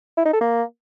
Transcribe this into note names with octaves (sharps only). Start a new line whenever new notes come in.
E4
D#4
A4
A#3